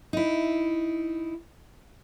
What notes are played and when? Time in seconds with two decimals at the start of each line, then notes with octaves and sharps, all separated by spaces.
0.13 D#4 E4